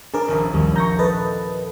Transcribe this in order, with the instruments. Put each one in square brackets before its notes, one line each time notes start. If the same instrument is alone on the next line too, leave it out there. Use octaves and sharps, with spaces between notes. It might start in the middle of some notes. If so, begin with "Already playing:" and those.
[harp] D4 [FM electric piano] G#4 A#4
[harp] D#1 A#1 F3
[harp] D#1 [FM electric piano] D#2 G3
[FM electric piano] A#5 C#6 [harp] G6 A#6
[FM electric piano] A4 B4 D#5 [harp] A6